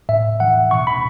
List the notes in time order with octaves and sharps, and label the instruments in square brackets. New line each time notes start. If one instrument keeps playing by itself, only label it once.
[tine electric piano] A2 E5
E3 F#5
B2 C#6
B5